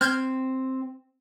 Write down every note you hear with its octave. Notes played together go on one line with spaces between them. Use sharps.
C4 F6 G6 G#6